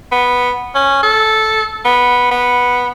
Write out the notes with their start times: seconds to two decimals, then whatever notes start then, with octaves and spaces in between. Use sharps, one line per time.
0.12 B3
0.75 C#4
1.03 A4
1.85 B3
2.31 B3